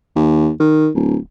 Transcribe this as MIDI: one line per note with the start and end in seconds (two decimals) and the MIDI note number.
0.16 0.50 39
0.60 0.89 51
0.95 1.17 26